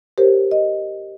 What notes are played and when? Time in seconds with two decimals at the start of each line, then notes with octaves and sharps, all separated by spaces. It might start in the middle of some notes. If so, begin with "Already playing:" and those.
0.18 G4 A#4 C5 C#5
0.51 D#5